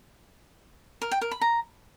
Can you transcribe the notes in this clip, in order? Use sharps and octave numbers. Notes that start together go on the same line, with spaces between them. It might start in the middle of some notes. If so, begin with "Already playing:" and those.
A#4
G5
A#4
B5
A#5